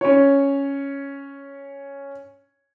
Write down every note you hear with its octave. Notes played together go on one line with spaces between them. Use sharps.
C#4 C#5